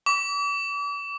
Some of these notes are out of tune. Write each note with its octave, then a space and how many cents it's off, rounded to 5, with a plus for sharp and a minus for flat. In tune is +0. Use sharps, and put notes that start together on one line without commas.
D6 -40